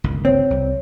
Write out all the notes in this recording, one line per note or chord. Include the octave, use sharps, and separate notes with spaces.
G1 C#2 D#3
C4 C#5
C2 G3